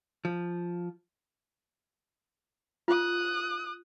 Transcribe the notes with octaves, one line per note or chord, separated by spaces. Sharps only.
F3
F4 D#6 F#6